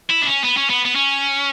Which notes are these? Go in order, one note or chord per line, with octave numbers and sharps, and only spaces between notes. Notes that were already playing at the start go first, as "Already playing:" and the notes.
E4
D4
C#4
B3
C#4
B3
B3
C#4